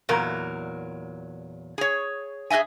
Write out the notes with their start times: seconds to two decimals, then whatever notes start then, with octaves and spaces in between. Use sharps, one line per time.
0.09 E2 A#2 F#3 A#4
1.78 G#4 C#5
2.50 G#4 B4 D#5 E5 G#5